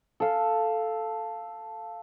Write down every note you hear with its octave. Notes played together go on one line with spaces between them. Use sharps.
A4 F5